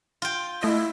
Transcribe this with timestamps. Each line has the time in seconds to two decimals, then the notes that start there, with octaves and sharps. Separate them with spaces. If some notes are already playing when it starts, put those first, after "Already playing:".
0.22 F4 G5
0.63 A3 E4 D#5